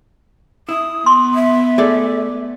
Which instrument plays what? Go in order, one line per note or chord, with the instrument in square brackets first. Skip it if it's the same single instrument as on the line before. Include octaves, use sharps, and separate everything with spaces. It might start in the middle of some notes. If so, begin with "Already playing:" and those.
[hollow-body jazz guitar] E4 [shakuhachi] D#6
[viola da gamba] B3 [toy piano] C6
[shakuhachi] E5
[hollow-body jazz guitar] A3 G#4 D5